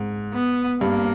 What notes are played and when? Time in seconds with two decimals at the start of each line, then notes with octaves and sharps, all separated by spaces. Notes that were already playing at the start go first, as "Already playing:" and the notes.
Already playing: G#2
0.33 B3
0.81 G2 A#3